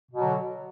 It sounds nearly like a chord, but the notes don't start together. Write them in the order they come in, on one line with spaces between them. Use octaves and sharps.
B2 F#3 D3